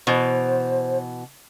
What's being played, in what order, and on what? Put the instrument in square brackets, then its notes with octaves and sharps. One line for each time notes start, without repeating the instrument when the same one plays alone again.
[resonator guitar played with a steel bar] B2 E3 [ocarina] C5